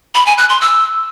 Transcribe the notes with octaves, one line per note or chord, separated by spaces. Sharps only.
B5
G#5
F#6
C6
E6